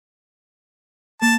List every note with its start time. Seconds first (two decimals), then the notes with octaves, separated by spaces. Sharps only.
1.22 A#3 A5